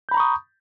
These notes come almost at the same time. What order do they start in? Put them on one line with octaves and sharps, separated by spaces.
G6 B5 A#5 C#6 D#6